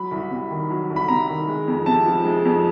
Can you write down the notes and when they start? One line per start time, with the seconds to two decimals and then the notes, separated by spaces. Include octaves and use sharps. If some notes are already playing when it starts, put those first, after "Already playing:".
Already playing: F#3 B5
0.11 C2
0.31 C3
0.51 D#3
0.70 F#3
0.90 C2
0.96 B5
1.08 C3 A#5
1.29 D#3
1.48 G#3
1.68 F2
1.86 C3 A5
2.06 F3
2.25 G#3
2.45 F2